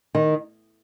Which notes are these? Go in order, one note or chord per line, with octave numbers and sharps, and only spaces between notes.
D#3